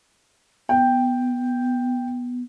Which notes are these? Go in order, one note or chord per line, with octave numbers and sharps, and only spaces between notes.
B3 G5